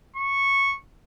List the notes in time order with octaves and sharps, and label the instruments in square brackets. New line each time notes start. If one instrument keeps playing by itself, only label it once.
[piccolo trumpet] C#6